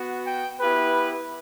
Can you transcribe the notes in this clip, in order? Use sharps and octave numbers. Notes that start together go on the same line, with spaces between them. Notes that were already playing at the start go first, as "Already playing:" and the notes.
Already playing: B3 F#4
G5
B3 E4 G4 B4